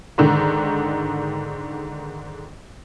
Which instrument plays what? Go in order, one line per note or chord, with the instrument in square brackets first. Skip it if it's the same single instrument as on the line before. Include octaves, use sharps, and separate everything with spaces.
[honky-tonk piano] G#2 D3 D#3